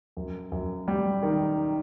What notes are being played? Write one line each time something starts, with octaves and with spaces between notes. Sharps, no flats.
F#2
F#2
G3
D#3